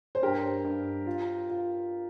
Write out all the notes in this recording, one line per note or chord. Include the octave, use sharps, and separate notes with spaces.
C5
G2 G4 A#4
G2
F4
F4